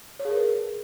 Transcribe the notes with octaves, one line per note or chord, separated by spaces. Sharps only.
C#5
G#4
A#4
B4